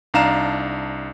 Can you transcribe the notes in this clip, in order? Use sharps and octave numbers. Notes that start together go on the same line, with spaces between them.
C2 D4 D#4 F5 A#5 E7